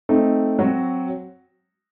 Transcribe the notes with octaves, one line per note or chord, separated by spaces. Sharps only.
A3 C4 D#4
F#3 C4 F#4